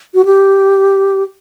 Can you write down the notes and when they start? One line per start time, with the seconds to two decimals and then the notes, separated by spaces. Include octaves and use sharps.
0.14 F#4
0.25 G4